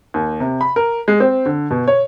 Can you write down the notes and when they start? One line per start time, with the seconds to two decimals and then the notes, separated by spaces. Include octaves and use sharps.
0.14 D#2
0.40 C3
0.61 B5
0.76 A#4
1.08 G#3
1.20 C4
1.46 D3
1.71 B2
1.88 C#5